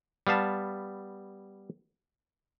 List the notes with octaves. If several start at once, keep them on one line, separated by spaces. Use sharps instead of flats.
G3 B3 F5 A5